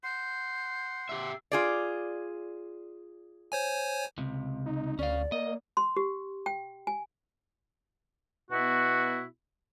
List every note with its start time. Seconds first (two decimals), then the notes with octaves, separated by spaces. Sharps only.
0.04 F#5 C6 G6 C7
1.09 G4 E5
1.52 F4 G#4 D5
3.52 C5 C#5 G#5
4.18 C#2 C3
4.66 D#4
4.99 D2 C#4 D5 F5
5.32 A#3 D#5
5.77 C6
5.97 G4
6.46 G5
6.87 G#5
8.51 B2 B3 E4 F#4